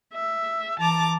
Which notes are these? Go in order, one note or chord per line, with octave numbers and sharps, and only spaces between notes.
E5
E3 A5 A#5 D6